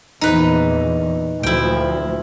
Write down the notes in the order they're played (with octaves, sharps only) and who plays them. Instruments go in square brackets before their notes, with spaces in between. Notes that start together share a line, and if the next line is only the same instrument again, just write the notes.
[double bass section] A#1 E2 [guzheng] D#4 B4
[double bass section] D2 A#2 F3 [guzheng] E4 G5